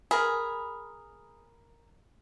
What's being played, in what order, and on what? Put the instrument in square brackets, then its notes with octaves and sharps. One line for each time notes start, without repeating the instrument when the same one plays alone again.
[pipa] G#4 [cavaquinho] A#4 B5